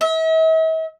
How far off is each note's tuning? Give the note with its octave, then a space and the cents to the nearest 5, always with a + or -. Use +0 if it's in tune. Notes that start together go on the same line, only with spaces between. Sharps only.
E5 -45